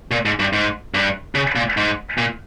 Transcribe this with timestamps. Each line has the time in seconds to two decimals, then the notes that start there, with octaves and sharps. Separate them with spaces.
0.11 A#2
0.25 G#2
0.40 G2
0.53 G#2
0.94 G2
1.35 C#3
1.56 A#2
1.77 G#2
2.18 A#2